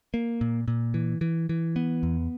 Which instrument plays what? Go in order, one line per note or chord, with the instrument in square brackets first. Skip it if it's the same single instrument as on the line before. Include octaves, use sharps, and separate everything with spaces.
[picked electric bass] A#3
A#2
A#2
E3
E3
E3
B3
E2